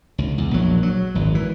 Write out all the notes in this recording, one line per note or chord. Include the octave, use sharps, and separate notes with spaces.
C#2
E2
A#1 F#3
F#3
G#1 F#2
E3